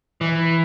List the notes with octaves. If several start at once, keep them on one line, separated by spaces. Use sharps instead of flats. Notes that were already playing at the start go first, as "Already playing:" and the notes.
E3